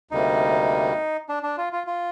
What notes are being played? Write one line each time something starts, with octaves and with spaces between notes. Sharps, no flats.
D2 C3 G3 A#3 D#4
D4
D4
F4
F4
F4